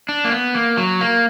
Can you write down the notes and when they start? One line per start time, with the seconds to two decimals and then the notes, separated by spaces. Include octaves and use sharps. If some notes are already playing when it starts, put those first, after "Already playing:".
0.09 D4
0.24 A#3
0.31 B3
0.55 A#3
0.78 F#3
1.01 A#3